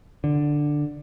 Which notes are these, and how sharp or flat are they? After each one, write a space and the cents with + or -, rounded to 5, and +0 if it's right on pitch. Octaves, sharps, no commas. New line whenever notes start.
D3 +5